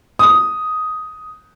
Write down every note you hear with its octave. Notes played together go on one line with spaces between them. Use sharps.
D#6